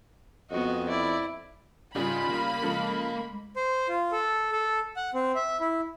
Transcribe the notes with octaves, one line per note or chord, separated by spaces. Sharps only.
F2 B3 F#4 D#5
E4 D5
C#3 G3 D#4 F4 G#4 B5
A#3 F5
C#3 F3 G#3 A4
C5
F4
A4
A4
F#5
C4
E5
E4